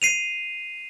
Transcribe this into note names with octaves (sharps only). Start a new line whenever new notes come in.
C7 D#7 F7